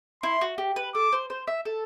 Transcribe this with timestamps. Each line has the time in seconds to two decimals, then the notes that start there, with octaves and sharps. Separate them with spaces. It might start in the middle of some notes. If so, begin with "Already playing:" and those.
0.23 E4 C6
0.41 F#4
0.58 G4
0.76 B4
0.94 A4 D6
1.12 C5
1.30 C5
1.48 E5
1.65 A4